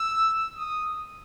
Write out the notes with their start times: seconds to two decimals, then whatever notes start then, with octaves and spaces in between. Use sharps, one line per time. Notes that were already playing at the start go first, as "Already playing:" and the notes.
Already playing: E6
0.57 D#6